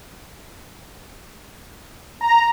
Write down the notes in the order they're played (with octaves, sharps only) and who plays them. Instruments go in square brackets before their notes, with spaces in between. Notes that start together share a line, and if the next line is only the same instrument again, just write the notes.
[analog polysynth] A#5